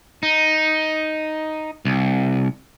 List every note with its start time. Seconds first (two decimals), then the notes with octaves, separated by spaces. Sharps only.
0.23 D#4
1.85 C2